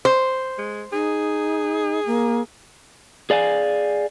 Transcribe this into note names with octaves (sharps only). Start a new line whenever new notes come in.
C5
G#3
D#4 G#4
A#3
G#4 D5 F5 G#5